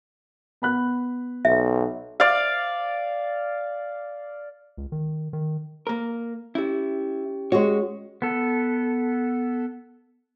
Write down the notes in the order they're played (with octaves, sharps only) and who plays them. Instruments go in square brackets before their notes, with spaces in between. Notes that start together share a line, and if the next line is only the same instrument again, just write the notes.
[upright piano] B3 B5 F#6
[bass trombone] B1 [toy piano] E5
[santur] D5 F5
[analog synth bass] C#2
D#3
D#3
[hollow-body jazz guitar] A#3 A#4
[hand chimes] C#4 G4 [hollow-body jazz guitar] E4
[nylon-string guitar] G#3 F#4 [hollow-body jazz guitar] C#5
[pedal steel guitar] B3 A4